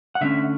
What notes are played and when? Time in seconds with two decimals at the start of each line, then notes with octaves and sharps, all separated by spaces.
0.15 F#5
0.21 D3 A3 C#4 E5